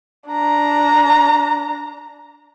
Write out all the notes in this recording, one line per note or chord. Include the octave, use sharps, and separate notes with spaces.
D4 A#5